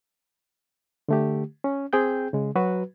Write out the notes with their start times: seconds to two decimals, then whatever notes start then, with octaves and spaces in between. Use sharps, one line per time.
1.09 D3 A3 G4
1.64 C#4
1.93 C4 G#4 G5 G6
2.33 C#3 G#3
2.55 F#3 F#4 B4